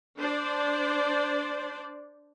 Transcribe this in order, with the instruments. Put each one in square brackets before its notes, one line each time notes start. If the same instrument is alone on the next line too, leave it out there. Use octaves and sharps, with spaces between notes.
[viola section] D4 C5 D5